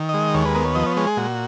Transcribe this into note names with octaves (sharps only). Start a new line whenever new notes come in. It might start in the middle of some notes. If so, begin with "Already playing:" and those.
Already playing: D#3
G#3 D#5
D#2 C#5
B4
B3 A#4
C#5
F3 D#5
C#5
G#3 C#5
G#4
A#2 F#4